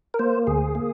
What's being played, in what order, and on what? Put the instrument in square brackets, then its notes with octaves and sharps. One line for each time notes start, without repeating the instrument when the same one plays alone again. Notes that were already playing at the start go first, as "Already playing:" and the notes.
[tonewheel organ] A#4
A#3 C5
D2 G#4
A#3